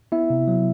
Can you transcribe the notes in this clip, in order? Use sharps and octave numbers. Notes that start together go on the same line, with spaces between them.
B3 E4 E5
C3
F#3